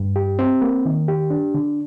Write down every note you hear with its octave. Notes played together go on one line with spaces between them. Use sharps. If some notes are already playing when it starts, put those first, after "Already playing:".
Already playing: G2
G4
C4
A#3
D#3
G4
D4
D3